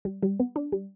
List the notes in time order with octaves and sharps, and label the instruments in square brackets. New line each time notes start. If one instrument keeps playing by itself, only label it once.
[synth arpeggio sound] G3
G3
B3
D4
G3